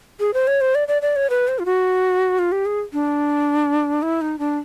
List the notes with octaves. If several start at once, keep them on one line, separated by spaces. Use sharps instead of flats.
G#4
C5
C#5
C5
D5
D5
D5
C#5
B4
C5
F4
F#4
F4
G4
G#4
D4
E4
D#4
D4